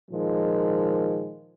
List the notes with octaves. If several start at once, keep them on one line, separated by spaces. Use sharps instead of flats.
A#2 D#3 F3 G#3